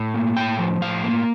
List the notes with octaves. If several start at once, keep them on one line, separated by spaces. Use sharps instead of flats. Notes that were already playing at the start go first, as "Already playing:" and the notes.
Already playing: A2
A#3
A2 G5
F3
A2 F5
A#3